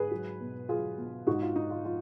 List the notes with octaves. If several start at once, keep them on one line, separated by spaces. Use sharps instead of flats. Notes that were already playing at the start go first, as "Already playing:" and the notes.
Already playing: G#2 G#4 B4
F#3
B2
F#3 F4 G#4
B2
G#2 D#4 F#4
F4
G#2 D#4
F4
F3 F4